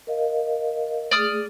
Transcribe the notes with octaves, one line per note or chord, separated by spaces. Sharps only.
A#4 D#5 F5
A3 G#4 D5 D#6 F6